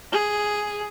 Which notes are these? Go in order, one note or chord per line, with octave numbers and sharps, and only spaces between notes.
G#4